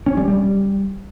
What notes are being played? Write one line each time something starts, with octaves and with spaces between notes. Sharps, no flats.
C#4
G3
G3